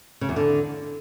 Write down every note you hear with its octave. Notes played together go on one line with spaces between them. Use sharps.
C#3
E2
D3